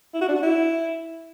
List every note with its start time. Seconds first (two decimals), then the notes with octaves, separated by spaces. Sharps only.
0.14 E4
0.21 F#4
0.28 D4
0.35 F#4
0.43 E4